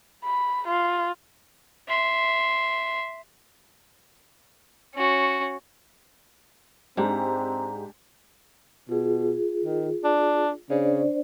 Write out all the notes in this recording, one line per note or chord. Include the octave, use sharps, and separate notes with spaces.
B5
F4
E5 C6
C#4 F#4
G#2 G#3 C4 D4 G4 A#5
B2 F4 G#4
D#3
D4
C#3 D4 C5 D5